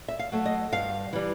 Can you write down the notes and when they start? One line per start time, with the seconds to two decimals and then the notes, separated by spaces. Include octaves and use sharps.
0.08 E5
0.19 F5
0.32 F#3 A3
0.46 D#5
0.72 G2 F5
1.13 E3 G3